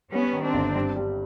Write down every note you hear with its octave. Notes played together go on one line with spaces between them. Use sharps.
G3 B3 C#4
D#3
C4 D4
G1
G2
G3